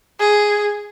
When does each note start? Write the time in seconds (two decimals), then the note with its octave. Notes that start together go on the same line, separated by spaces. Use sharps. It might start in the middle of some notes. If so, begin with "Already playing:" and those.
0.20 G#4